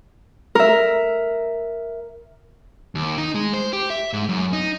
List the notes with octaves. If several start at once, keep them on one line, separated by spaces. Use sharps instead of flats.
A#4 E5
D#2
D#4
G#3
C5
G4
E5
G#2
F#2
D#4